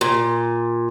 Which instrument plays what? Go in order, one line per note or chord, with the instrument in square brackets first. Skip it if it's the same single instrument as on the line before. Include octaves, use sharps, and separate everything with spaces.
[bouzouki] A#2